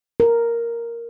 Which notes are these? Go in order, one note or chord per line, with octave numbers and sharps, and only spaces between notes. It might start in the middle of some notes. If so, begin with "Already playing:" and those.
A#4